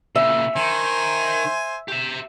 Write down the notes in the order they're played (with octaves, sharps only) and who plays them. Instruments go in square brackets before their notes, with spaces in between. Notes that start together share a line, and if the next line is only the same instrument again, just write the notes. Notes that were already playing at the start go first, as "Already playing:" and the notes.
[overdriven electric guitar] A#2 C#3 [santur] E5
[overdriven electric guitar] D#3 [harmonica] C5 G#5
[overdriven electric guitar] G4 E5